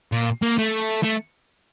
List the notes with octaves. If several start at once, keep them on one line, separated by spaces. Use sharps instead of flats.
A#2
A#3
A3
A3